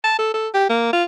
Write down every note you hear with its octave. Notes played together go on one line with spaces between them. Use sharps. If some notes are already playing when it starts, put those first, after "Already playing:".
A5
A4
A4
G4
A#3
F4